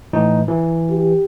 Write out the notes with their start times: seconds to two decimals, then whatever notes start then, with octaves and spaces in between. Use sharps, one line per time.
0.13 A2 E3 D#4
0.48 E3
0.91 G4